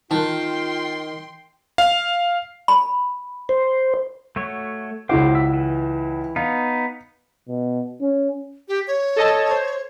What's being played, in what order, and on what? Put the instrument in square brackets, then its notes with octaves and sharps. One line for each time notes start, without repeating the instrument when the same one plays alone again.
[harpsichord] D#3 [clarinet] F4 [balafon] A#4 A5 [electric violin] G5 C6
[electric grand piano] F5
[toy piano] B5
[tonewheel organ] C5
[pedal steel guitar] A3 F#4 C#5
[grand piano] C#2 E4 F#4 [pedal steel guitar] C5 D6
[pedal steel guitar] E5
E3
[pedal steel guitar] B3 D#4 [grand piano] F5
[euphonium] B2
C#4
[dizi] G4
C#5
[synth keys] A4 D#5 A5
C5